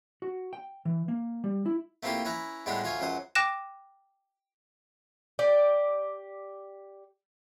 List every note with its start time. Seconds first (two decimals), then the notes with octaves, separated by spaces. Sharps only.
0.22 F#4
0.53 G5
0.85 E3
1.08 A#3
1.44 G3
1.66 E4
2.03 A3 A#3 C4 E4 F4 G4
2.25 C#4 E4 B4 A#5
2.66 A2 G3 G#3 B3 D4 G4
2.84 D2 F4 C#5 G#5
3.00 C#2 F#2 F#3 C5 D#6
3.35 G5 D6 F#6 A#6 E7
5.39 G4 D5